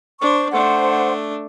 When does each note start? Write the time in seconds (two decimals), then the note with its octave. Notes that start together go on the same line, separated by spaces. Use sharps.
0.21 D4 C5 C#6
0.52 A3 D4 C5 F#5